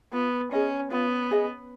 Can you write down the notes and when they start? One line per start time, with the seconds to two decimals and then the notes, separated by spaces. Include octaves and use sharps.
0.13 B3 F4
0.52 C#4 G#4 D#5
0.91 B3 F4
1.31 G#4 D#5